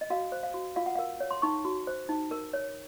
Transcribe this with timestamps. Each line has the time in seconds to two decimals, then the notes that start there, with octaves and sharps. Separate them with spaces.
0.01 D#5
0.10 F#4 F5
0.32 C5
0.43 F5
0.54 F#4
0.76 F4 F5
0.86 F#5
0.95 A#4 F5
1.20 C#5
1.31 C6
1.42 D#4 C#6
1.65 F#4
1.87 C5
2.09 D#4
2.31 A#4
2.53 C#5